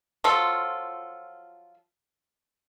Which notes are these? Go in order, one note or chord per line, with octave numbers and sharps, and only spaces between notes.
F3 F#3 F4 A4